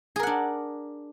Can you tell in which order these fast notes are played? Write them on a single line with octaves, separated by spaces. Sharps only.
G#4 A#4 F#5 D4